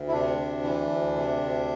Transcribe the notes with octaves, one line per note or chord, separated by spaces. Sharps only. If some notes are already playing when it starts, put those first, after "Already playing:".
Already playing: D2
E4
C3 D4
D2
E3
D2
C3
D2